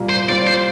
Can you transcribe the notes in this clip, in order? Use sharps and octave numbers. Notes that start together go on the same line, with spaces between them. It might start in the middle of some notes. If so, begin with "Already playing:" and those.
Already playing: C2 A#2 G3 A#3
C5
G3 C4 F4 D5
C5